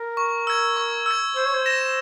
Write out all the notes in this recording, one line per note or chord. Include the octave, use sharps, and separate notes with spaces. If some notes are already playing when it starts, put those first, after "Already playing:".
Already playing: A#4
C#6
E6 G#6
C#6
E6 G#6
C5 E6
C#5
C5
A#6 E7